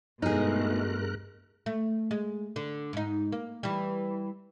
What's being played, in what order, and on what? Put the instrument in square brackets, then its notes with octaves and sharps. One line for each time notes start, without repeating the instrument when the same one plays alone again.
[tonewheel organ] G2 A#4 F#6 [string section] B2 G#3 A3 [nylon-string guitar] D#4 G#4
[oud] A3
G#3
D3
G#2 D#4
A#3
E3 G3